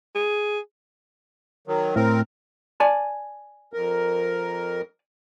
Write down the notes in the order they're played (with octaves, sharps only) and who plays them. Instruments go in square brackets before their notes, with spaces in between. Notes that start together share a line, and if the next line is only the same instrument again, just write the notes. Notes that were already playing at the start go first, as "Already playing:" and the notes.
[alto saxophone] G#4
[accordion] D#3 F#3
[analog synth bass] A2 [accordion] C4 A#4
[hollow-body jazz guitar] D5 G#5 A5
[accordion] F2 A#4